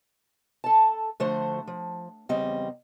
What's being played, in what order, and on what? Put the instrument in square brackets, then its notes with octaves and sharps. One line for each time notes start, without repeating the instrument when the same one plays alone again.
[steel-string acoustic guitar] A4 A5
D3 F3 A3 F#4 C5
F3
E2 C#3 G3 C4 D#5